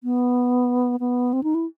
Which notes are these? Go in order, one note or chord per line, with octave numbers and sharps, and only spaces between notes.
B3
B3
C4
D#4
E4